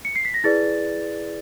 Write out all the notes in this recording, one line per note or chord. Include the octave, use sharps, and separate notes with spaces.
C#7
C7
B6
A#6
E4 G#4 B4 D5 A6